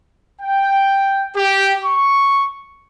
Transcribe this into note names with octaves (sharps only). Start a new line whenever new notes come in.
G5
G4
C#6